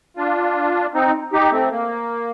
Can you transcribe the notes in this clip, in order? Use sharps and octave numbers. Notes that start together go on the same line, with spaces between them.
D4 F4
C4 D#4
D#4 G4
A3 C4
A#3